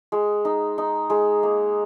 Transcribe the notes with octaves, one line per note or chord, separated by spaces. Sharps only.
G#3
D#4
D#4
G#3
A#3